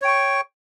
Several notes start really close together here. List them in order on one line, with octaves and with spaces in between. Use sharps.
C#5 G5 C#6